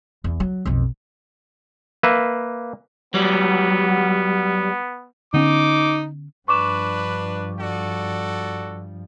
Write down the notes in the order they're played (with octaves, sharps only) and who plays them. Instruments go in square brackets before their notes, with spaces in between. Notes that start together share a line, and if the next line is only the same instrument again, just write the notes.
[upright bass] E2
F#3
B1 F2
[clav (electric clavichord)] A#3 B4 E5
[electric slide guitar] F#3 G3 [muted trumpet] B3
[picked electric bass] D3 B3 C#4 [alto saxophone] D#4 [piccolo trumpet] D6
[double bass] G2 F3 [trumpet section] D4 B4 [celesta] C#6 D6 E7
[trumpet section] F#4 A4 D5